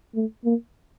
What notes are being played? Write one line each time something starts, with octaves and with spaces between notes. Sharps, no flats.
A3
A#3